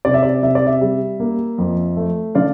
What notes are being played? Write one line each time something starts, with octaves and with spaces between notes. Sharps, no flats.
C3 D5
E5
D5
C3 E5
D5
E5
G3
A#3
F2
A3
D3 D5 F5